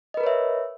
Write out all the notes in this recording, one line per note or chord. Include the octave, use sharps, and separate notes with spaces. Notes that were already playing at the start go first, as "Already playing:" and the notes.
A#4 B4 C#5 D#5 E5